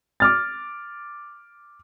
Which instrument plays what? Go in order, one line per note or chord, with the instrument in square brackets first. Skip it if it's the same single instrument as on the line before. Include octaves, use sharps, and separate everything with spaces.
[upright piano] D6 F6 A6